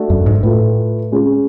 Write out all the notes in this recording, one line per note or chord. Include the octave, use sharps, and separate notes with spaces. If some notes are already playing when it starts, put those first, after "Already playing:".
Already playing: A3 D4 F#4
F#2
G#2
A2 A3 F4 B4
G#3 C#4 F4 G#4